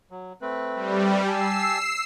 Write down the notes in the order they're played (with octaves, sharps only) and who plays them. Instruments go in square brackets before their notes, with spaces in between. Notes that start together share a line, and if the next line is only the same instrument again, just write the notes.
[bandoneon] F#3
A3 C4 B4
[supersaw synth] G3
[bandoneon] G4 G#5 A5 [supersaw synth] E6 C7